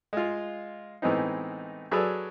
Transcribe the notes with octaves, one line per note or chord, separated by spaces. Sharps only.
G#3 F4
A2 E3 G#3 B3 C4 D#4
F#3 G#4 A4 B4 D5 E6